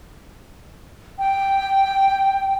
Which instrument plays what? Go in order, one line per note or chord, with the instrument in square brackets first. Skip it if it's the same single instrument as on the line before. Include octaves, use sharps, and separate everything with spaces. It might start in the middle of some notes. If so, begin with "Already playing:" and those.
[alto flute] G5